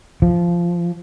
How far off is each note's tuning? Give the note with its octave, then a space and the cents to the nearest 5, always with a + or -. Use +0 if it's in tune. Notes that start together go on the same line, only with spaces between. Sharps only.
F3 -10